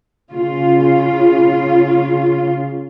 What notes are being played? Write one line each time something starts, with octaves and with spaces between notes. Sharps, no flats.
C#3 F4